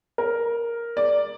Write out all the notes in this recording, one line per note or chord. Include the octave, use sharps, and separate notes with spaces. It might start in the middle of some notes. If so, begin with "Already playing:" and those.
A#4
D5